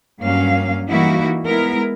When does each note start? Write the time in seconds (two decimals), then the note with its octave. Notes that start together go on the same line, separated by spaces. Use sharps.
0.21 G2 F#3 A#3 C#4 F5
0.89 E3 G3 A#3 D#4 E4 F#4
1.45 G#3 B3 E4 A#4